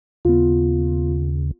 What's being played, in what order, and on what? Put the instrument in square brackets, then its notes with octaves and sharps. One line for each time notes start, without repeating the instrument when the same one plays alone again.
[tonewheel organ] D#2 C#3 [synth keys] B3 F4